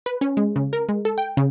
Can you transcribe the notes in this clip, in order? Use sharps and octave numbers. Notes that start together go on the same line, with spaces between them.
B4
C#4
G#3
C#3
A#4
G#3
A4
G5
C#3